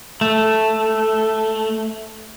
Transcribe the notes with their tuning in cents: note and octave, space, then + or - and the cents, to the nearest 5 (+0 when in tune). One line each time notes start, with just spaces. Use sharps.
A3 +0